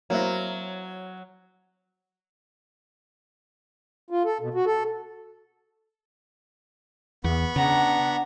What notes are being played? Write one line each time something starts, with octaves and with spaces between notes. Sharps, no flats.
F#3 A#3 C4 E4
F4
A4
B2
F#4
A4
E2 B3 B5 C#6
C#3 D4 F#5 A#5